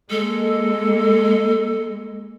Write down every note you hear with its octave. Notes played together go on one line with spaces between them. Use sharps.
G#3 A#3 A4